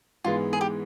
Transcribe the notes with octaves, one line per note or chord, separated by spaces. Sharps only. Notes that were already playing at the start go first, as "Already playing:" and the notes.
G#2 E3 G#3 B3 F4
G#4
G4